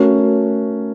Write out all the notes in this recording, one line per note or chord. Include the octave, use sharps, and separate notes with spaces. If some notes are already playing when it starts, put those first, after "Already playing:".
Already playing: A3 C#4 F#4 A#4